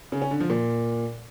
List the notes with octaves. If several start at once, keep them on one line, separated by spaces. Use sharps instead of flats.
C#3
C#4
D3
F3
A#2